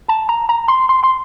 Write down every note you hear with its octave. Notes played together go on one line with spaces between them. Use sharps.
A5
A#5
A#5
C6
C6
C6